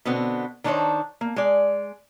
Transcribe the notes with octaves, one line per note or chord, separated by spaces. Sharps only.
B2 D3 B3 C4
D#3 D4 D#4 C5 C#5
A#3
G#3 D5